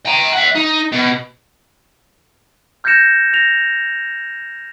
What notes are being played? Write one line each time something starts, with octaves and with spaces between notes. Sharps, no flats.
G5 A#5
E5 F#5
D#4
B2
F6 G6 G#6 A#6 C#7 E7
A#6 F7